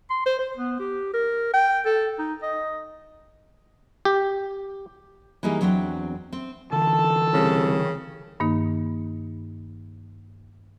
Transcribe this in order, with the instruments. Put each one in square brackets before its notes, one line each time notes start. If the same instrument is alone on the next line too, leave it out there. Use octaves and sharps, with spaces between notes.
[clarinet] C6
C5
C5
B3
G4
A#4
G5
A4
D#4
D#5
[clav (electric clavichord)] G4
[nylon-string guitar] E3 G3 A#3 D#4 G#4
E2 F#3 C4 D4 G5
C4
[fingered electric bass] D3 E3 [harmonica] A4 A5
[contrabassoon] C2 [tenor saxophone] C#3
[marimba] G2 D#3 A#3 D#4